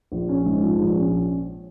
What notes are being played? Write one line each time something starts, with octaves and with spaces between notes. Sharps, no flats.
A#1
C#4
G#2
F3
A#1
C#4